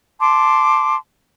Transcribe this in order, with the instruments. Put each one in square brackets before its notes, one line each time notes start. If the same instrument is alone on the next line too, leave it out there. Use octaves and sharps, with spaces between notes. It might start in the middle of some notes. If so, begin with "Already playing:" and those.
[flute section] A5 C6 D6